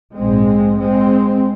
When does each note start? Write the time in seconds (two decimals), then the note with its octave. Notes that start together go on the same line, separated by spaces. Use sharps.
0.17 A#1 G#2 G#3 C4
0.80 G#3 C4